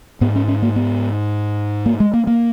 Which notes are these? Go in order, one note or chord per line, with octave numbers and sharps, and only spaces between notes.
G#2 B3
C#4
C#4
A#3
B3
A#3
G#3
A#3
A#3